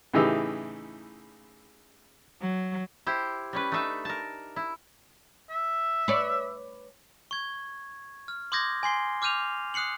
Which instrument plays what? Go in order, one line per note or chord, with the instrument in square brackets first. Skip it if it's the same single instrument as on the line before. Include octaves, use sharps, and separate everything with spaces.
[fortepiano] A2 C#3 E3 D#4 G4 E6
[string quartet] F#3
[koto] E4 G4 C5
G3 C#4 B4
A3 D4 D#4 B4 E5
A#4 A5
E4
[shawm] E5
[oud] B4 C#5 D5
[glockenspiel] C#6 G#6
F6
C6 D6 D#6 G6 G#6 A#6
G#5 C6 C7 G7
D6 F6 G6 D#7 F7
D#6 F#6 C7 C#7 F#7